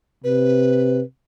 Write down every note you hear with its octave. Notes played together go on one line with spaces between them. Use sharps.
C3 B4